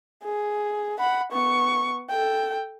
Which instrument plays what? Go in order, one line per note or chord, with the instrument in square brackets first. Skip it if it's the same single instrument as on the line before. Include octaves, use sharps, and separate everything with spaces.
[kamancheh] G#4
F#5 B5
B3 C#6
A4 G5